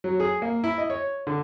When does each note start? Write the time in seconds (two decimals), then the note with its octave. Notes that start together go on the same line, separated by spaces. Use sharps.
0.04 F#3
0.20 G#4
0.42 A#3
0.64 E4
0.78 D#5
0.90 C#5
1.27 D3